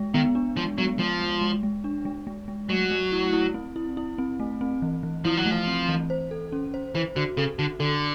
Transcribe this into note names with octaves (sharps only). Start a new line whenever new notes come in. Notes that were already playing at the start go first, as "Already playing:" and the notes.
Already playing: G#3
D#3 B3
D4
F3 G#3
F#3 B3
F3 G#3
G#3
G#3
G#3
D4
G#3
G#3
G#3
F#3 A3
A3
E4
E4
C4
E4
E4
C4
A3
C4
E3
E3
F3 E4
F#3
A3
F3
C4
E3
C5
A4
C#4
C5
E3 C5
D3 F#4
C#3 A4
D3 F#4
D3 A4